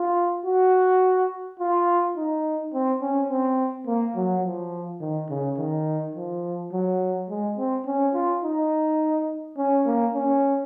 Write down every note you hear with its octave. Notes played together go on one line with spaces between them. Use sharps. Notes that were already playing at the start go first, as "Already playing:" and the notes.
Already playing: F4
F#4
F4
D#4
C4
C#4
C4
A#3
F#3
F3
D#3
C#3
D#3
F3
F#3
G#3
C4
C#4
F4
D#4
C#4
A#3
C#4